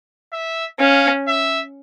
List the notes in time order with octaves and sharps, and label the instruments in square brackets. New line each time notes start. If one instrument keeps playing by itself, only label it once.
[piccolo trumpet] E5
[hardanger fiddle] C#4 [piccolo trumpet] F5
[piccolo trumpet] E5